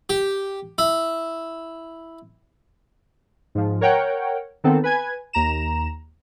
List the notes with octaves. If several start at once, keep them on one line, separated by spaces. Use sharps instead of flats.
G4
E4
G#2 F3
A#4 C#5 F#5 G5
D#3 B3 C4 A4
B4 G#5 G#6
D#2 A#5 E7